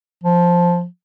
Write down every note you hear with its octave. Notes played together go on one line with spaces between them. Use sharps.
F3